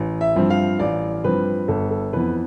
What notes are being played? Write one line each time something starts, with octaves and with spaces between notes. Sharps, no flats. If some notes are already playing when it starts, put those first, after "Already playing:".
Already playing: A1
E5
G2 F3 C4
F5
A1 D5
G2 F3 C4 B4
G1 A4
A4
F2 E3 B3 B4